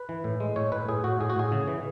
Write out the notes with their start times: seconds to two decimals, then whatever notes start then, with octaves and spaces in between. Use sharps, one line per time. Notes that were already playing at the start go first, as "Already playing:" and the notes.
Already playing: B4
0.09 E3
0.24 A2
0.40 G#3
0.56 A2 C#5
0.72 A2 B4
0.88 A2 G#4
1.04 A2 F#4
1.20 A2 G#4
1.30 F#4
1.36 A2 G#4
1.52 C#3
1.68 E3